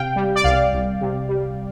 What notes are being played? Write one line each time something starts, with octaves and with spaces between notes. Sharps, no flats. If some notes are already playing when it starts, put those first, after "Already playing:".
Already playing: C3 F5 G5
G3
D5
C2 F5
C2
C3
G3